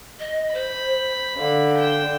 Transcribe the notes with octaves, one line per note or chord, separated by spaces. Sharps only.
D#5
C5 B5
D3 F5
G5 E7